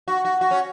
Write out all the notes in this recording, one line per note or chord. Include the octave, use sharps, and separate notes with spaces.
F#4
F#4
F#4
C#4